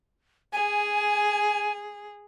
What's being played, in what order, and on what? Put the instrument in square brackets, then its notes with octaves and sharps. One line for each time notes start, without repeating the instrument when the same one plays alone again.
[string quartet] G#4 [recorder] G#5